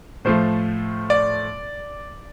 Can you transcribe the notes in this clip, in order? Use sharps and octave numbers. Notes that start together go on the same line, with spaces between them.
A2 F3 A3 C5
D5